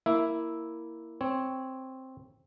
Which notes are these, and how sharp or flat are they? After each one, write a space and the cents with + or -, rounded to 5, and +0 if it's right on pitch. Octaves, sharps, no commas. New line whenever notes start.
A#3 -5 E4 +0 E5 +0
C4 +0 C#5 +0